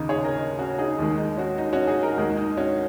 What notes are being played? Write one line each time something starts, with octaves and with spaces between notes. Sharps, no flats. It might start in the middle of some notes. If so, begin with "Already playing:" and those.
Already playing: D#2 C#3 A#3 D#4
G#4 C#5
A#4 D#5
C#4 F#4
D#4 G#4
D#2 D#3 G#3
D#4
C#4 F#4
D#4
C#4 F#4
D#4 G#4
F#4 A#4
D#2 D#3 G#3 D#4
D#4
C#4 F#4